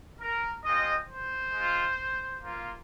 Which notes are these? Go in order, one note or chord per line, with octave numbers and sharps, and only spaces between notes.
A#4
G#3 C4 F4 D#5
C5
G#3 F4
A#3 F4